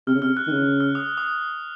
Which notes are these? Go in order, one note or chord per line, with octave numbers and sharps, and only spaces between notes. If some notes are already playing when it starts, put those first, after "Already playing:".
C3 F6
C#3
C3 F6
F#6
D#3
C#3
F6
D#6
D#6